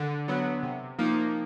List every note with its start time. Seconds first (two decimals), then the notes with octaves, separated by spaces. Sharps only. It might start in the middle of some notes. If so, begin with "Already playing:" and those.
Already playing: D3
0.28 F#3 B3
0.63 C3
0.98 F3 A#3 D#4